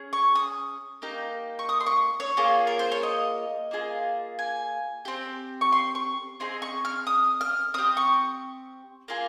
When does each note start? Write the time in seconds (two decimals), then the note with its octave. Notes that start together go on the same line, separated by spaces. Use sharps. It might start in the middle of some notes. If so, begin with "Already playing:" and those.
Already playing: C#4 G#4
0.13 C#6
0.35 D#6
1.02 A#3 D#4 G4
1.59 C#6
1.69 D#6
1.80 C6
1.86 C#6
2.20 C#5
2.37 A#3 F4 G#4
2.67 A#4
2.79 C5
2.92 C#5
3.03 D#5
3.71 A#3 F4 G#4
4.39 G#5
5.05 C4 G4
5.61 C#6
5.72 C6
5.95 C#6
6.40 C4 D#4 G#4 C6
6.62 C#6
6.85 F6
7.07 D#6
7.41 F6
7.74 C4 G4 D#6
7.97 C#6
9.08 A#3 F4 G#4